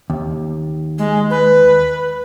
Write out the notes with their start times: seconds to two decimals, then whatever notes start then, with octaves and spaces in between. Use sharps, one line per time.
0.10 D#2
0.98 G#3
1.30 B4